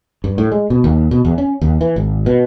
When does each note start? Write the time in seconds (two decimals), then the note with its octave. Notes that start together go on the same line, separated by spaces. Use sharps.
0.24 G2
0.38 A2
0.52 G#3
0.70 B2
0.84 D#2
1.11 B2
1.25 E2
1.38 C#4
1.61 D#2
1.81 E3
1.96 G#1
2.26 B2